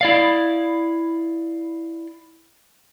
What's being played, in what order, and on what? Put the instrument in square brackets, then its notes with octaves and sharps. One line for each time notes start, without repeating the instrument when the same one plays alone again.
[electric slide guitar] E4 D5 F5